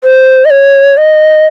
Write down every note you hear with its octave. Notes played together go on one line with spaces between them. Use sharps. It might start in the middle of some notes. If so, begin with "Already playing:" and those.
C5
D#5
C#5
D#5